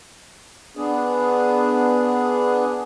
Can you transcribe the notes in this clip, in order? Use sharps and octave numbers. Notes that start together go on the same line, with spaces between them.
B3 D4 G#4